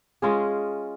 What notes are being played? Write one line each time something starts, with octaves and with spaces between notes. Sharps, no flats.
G#3 C#4 F4 G#4